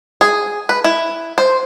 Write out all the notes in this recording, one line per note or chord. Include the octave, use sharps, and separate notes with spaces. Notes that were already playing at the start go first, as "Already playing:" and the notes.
G#4
B4
E4
C5